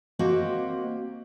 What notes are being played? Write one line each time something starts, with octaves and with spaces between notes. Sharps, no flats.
A#3 C4 F#4 G4 D#5